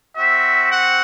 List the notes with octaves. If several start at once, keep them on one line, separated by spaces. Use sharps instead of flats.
C4 F#4 E5
F#5